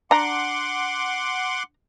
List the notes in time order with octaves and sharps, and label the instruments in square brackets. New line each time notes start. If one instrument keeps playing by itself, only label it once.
[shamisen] D4 A#5 [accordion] F#5 C6 D6